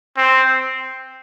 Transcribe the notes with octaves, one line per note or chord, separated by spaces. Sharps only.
C4